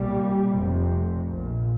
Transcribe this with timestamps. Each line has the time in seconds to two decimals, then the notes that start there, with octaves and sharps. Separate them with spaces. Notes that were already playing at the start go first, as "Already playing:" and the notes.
Already playing: C2 A#2 G3
0.52 F1 F2 C3
1.27 A#1 A#2